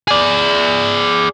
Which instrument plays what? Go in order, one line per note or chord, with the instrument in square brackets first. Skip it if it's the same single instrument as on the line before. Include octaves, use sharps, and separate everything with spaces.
[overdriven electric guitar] G#4 D5